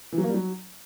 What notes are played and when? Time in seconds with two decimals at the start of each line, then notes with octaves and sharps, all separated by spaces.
0.12 E3
0.18 F#3
0.23 A#3
0.29 G3
0.34 F#3